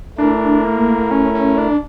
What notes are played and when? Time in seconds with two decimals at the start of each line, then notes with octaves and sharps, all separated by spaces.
0.18 A3 D4 E4 A#4
0.65 A#3
1.11 C#4
1.34 C#4
1.58 D4